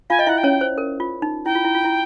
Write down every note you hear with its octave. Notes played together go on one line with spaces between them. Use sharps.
F4 F5 G#5
D#5 G5
E4 E5 F#5
G5
C#4 C#5
C5
A#4
F4
D#4
E4 G5
F4
E4
F4
E4